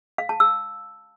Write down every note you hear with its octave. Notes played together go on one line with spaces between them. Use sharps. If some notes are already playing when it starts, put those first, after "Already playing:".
F5
A5
E6